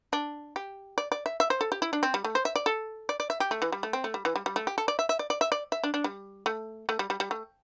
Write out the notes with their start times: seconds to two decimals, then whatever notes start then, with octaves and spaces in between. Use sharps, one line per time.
0.13 D4
0.56 G4
0.98 D5
1.12 D5
1.26 E5
1.40 E5
1.50 C5
1.61 A4
1.72 G4
1.82 E4
1.93 D4
2.03 C4
2.14 G3
2.24 A3
2.35 C5
2.45 E5
2.56 D5
2.66 A4
3.09 D5
3.20 D5
3.30 E5
3.40 G4
3.51 A3
3.62 E3
3.72 G3
3.83 A3
3.93 C4
4.04 A3
4.14 G3
4.25 E3
4.36 G3
4.46 G3
4.56 A3
4.67 G4
4.78 A4
4.88 D5
4.99 E5
5.09 E5
5.19 D5
5.30 D5
5.41 E5
5.52 D5
5.72 E5
5.84 D4
5.94 D4
6.04 G3
6.46 A3
6.89 A3
6.99 G3
7.10 G3
7.20 G3
7.31 A3